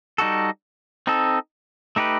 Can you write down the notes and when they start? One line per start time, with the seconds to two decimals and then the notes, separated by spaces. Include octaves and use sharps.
0.18 G3 D#4 F#4 A4
1.07 C4 D#4 A4
1.96 A3 D#4 G4 B4